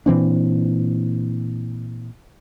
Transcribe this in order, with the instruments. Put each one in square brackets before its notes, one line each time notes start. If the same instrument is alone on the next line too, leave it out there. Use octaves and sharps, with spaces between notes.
[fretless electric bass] A#2 E3 C4 D4